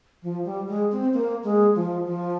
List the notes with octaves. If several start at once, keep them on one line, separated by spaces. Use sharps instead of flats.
F3
G3
G#3
C4
A#3
G#3
F3
F3